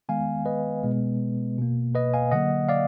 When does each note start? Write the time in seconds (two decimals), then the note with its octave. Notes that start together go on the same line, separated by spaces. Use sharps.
0.09 D#3 G#3 B3 F5 G#5
0.46 B4 D#5
0.84 B2 G#3 B3
1.58 B2 A#3
1.95 B4 D#5
2.14 F5 G#5
2.31 D3 F#3 A#3 D#5 F#5
2.69 D5 F5